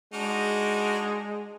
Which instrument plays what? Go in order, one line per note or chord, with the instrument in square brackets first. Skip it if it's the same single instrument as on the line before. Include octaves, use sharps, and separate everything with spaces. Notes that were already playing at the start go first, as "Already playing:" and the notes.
[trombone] G#3 [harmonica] D4 D#4 F#4